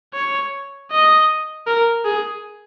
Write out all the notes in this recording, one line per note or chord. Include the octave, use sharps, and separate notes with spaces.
C#5
D#5
A#4
G#4